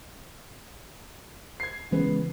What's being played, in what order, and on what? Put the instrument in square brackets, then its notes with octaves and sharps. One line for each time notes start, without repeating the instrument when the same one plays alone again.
[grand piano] G#6 C7
[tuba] C#3 [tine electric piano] E3 [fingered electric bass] G#3 [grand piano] B3